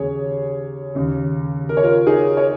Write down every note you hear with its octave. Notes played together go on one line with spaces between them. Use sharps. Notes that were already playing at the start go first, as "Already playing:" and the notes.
Already playing: D#2 C#3 G#4 C#5
D#2 C#3
A#4
C#5
F4 A#4
D#4 G#4
C#5